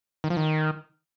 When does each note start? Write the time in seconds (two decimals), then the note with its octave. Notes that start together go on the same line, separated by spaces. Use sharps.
0.24 D#3
0.30 F3
0.37 D#3